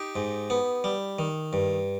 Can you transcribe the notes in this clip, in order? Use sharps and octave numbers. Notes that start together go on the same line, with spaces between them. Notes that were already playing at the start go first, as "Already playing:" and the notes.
Already playing: D#4 G4
G#2
B3
G3
D#3
G2